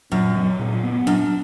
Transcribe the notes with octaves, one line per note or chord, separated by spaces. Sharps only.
F#2 A#2
F#3
A#2
B3
F#2 D4